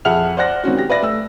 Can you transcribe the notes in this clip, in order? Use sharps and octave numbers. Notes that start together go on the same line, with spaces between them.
F2 G#4 E5 F#5 F6 F7
C5 D5 F#5 F#6 A#6
G#1 C4 C#4 F#4
G4 A#6
B4 D5 E5 A#6
A3 E6